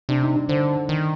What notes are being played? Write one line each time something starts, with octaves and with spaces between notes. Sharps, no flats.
C3 D4
D#4
D#4
D3 C5
D#3